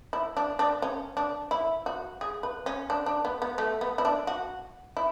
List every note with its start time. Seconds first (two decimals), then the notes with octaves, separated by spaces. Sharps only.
0.13 E4
0.37 D4
0.59 D4
0.82 C#4
1.17 D4
1.51 E4
1.86 F#4
2.21 G#4
2.43 B4
2.66 C#4
2.90 D4
3.06 D4
3.25 B3
3.42 B3
3.58 A3
3.81 B3
3.98 E4
4.05 D4
4.27 F#4
4.97 E4